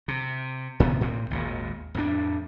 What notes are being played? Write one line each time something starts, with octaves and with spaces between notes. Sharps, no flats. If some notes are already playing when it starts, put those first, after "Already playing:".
C3
A2 C3 D#3 B3
A2 C4
G#1 D#2 A#2
F2 A2 D4